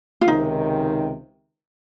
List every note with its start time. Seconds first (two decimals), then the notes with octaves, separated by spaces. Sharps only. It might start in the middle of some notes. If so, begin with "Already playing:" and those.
0.21 F4
0.27 C#2 C3 D#3 D#4